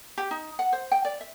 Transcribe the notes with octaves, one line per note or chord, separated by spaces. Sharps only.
G4
D#4
F#5
C5
G5
D5
E5